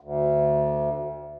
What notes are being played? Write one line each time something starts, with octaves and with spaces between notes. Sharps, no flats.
D2